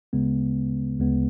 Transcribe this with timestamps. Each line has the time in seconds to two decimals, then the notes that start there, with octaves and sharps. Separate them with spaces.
0.13 D2 C#3 G#3 B3
0.99 D2 C#3 G#3 B3